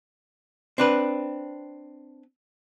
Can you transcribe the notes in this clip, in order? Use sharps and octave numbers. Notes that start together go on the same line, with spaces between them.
C4 D4 B4